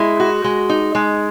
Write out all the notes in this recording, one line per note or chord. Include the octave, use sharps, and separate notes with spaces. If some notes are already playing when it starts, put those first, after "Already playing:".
Already playing: G#3 E4
F#4
G#3
D#4
G#3